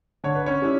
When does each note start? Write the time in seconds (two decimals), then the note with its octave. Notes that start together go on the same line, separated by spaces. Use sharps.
0.24 D3 C#5
0.35 B4
0.46 C#4 C#5
0.62 G3 C#4 E4